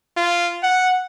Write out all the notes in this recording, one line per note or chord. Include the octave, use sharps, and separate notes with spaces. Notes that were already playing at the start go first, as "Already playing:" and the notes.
F4
F#5